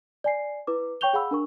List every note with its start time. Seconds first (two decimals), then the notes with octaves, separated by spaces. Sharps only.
0.24 D5 G#5 C7
0.67 E4 B4 D6
1.01 C#5 G5 C#6 G6 F7 G7
1.13 G#4 F5 F#5 B5 E6
1.31 D4 A#4 C#6